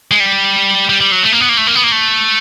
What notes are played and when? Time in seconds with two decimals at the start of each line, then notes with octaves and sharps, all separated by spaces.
0.11 G#3
0.20 G3
0.89 G3
1.01 G3
1.12 F#3
1.23 A3
1.32 A#3
1.41 B3
1.49 A#3
1.57 A3
1.67 A#3
1.75 B3
1.84 A#3
1.92 A3